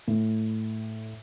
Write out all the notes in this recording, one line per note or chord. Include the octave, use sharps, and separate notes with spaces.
A2